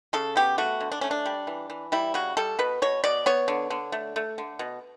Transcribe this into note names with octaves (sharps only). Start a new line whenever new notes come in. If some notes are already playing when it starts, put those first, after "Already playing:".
C#3 A4
B3 G4
A3 F#4
D3
D4
A3 C#4
D4
G3
E3
E3
G3 E4
C#3 F#4
G3 A4
B2 B4
B2 C#5
B2 D5
B3 C#5
D3
D3
A3
A3
D3
B2